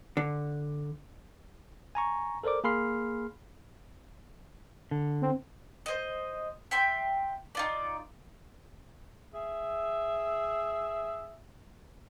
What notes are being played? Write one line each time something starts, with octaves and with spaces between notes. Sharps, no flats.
D3
G#5 A#5 C#6
A4 A#4 C5 D5 D6
A#3 G#4 B5 C6 F6 C7
D3
C4
C5 D#5
E5 G5 C6
D#4 F4 D5
G#4 E5